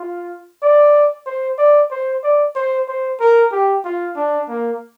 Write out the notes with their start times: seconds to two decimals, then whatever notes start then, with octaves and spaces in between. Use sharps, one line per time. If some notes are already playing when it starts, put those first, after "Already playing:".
Already playing: F4
0.63 D5
1.26 C5
1.58 D5
1.91 C5
2.23 D5
2.56 C5
2.88 C5
3.20 A#4
3.52 G4
3.85 F4
4.16 D4
4.48 A#3